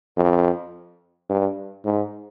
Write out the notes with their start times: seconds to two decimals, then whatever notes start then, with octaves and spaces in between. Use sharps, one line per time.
0.17 F2
1.29 G2
1.85 G#2